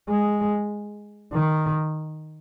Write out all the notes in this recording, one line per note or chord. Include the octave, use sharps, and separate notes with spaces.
G#3
D#3